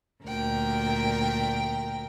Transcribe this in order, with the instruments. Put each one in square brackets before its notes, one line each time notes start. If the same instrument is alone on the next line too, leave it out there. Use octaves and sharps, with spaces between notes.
[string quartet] D2 A#2 A#4 G5